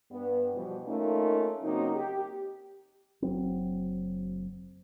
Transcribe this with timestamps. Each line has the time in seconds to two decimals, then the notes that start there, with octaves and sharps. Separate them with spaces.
0.11 G2 B3
0.54 B2 E3 F3 G3
0.86 A3 A#3 C#4 D#4 F4 A#4
1.63 C#3 F#3 A#3 C4 D#4
1.95 G4
3.22 F#1 F#3 C4